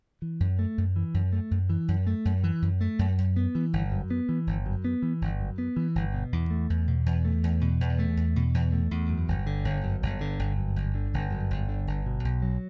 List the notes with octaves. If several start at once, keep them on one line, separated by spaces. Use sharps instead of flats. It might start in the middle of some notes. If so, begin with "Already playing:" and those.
E3
F#2
A3
F#2
E3
F#2
A3
F#2
E3
F#2
A3
F#2
E3
F#2
A3
F#2
F#2
B3
E3
G1
F#2
B3
E3
G1
F#2
B3
E3
G1
F#2
B3
E3
G1
B2
E2
A3
E2
B2
E2
A3
E2
B2
E2
A3
E2
B2
E2
A3
E2
F#2
G1
D3
G1
F#2
G1
D3
G1
F#2
G1
D3
G1
F#2
G1
D3
G1
B2
B1
F#3